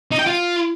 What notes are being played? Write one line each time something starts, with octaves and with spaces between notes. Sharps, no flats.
D#4
G5
F4